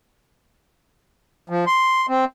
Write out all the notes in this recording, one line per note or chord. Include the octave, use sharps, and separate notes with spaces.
F3
C6
C4